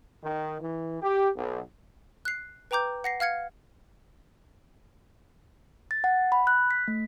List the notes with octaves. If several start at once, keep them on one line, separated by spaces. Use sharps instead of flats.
D#3
E3
G4
B1
F#6 C7
B4 G5 A#5 D6 G6
F#5 A#6 C7
F5 F6 G#6 C#7
A6
F#5
B5
F#6
B6
A3